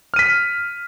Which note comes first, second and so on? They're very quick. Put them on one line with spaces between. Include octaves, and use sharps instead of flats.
F6 D#7 B6